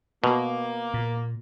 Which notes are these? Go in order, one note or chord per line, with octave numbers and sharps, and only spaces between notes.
B2 A#3
A#2